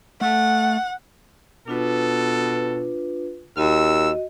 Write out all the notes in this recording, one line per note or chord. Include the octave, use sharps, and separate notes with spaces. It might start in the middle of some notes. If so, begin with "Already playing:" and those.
A3 F#5
B2 D4 F4 A4 B4
D#2 F#4 D#5 E6